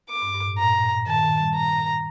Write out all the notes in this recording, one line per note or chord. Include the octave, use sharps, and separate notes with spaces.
D6
G2
G2
A2
A#2 A#5
D#3 A5
D#3
G3
A#5